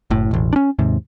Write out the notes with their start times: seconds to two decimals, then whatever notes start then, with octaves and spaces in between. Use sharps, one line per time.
0.11 F#1 A2
0.31 E1 A1
0.53 C#4 D4
0.79 D#2 G#2 C3